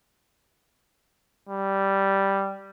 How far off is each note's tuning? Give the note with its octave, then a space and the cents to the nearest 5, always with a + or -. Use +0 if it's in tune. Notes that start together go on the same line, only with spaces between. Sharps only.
G3 -5